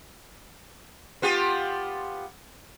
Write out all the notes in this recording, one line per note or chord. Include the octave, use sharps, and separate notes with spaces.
B3 F4 G4